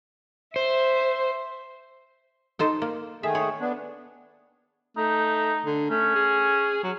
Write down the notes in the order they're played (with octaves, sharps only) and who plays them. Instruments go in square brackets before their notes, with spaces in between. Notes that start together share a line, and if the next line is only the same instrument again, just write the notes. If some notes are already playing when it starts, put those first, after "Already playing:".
[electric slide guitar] C5 [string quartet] E5 C6
[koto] D#4 A4 C5
A#3
[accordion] D#3 A3 G#4 [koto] E5
[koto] C#5
[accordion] B3 D4
[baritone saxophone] A3 [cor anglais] D#4
[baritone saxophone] D3
[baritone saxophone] A3 [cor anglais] C#4
[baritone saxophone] G#4
F#3